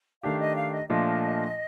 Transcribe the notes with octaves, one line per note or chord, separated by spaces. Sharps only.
D#3 A3 D4 G4 F5
D#5
F5
D#5
A#2 F3 A3 D4 F4 D#5